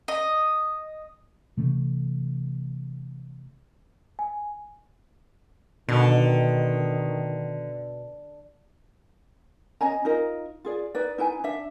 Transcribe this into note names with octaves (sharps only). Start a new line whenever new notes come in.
D#5
C3 E3 A3 C#4
G#5
B2 D3 D#3
C#4 D#5 G#5 A#5
D#4 F4 A#4 D#5
F4 G#4 D5
D#4 B4 D5
D#4 E4 B4 G#5
D4 E5